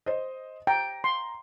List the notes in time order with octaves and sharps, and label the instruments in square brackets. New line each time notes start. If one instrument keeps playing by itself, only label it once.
[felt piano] C5 D#5
[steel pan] G5 [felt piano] A#5
[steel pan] C6